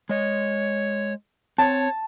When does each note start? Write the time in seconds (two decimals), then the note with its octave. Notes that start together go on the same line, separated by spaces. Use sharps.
0.09 G#3 C#5 D#5
1.58 C4 C#5 A5